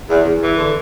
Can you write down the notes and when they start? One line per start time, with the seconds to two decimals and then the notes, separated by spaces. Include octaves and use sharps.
0.08 E2
0.24 E2
0.40 E3
0.57 D3